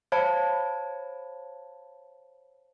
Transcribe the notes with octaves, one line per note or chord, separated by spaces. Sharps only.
C5 C#5 F5 A5 B5 G#6